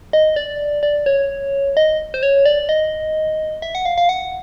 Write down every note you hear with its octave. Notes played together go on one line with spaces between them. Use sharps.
D#5
D5
D5
C#5
D#5
C5
C#5
D5
D#5
E5
F#5
F5
F5
F#5